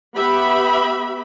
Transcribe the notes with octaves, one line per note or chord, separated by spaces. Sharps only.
B3 G4 E5 B5